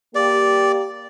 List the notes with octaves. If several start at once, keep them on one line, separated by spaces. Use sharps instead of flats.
A#3 G4 D5